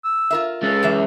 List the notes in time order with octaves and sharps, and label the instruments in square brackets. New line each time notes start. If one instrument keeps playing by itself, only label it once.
[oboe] E6
[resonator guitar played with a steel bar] F4 A#4 E5
[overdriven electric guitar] G#3 C#4 [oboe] A4
[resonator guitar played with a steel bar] F#2 E3 E5